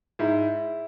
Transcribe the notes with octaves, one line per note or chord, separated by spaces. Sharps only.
G#2 E4